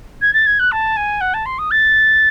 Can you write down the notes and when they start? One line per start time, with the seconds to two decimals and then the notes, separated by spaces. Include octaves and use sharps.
0.21 G#6
0.33 A6
0.46 G#6
0.59 F#6
0.71 A5
0.96 G#5
1.20 F#5
1.33 A5
1.45 C6
1.58 D#6
1.71 A6